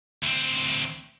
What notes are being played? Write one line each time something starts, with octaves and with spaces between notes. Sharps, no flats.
D2 C4